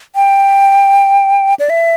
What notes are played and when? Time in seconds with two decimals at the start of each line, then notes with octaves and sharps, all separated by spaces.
0.15 G5
1.59 D5
1.69 E5